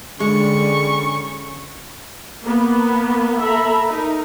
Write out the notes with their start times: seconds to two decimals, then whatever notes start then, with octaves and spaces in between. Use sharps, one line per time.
0.20 D3 G3 G#3 C#4 C#6
2.44 A#3 B3
3.41 A4 E5 A#5 B5
3.85 D#4 A#4